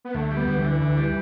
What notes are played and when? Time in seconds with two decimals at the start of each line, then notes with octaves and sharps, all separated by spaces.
0.05 B3
0.14 D2 A3
0.31 G3
0.37 B3
0.48 D2
0.58 E3
0.64 D3
0.81 D2
0.98 G3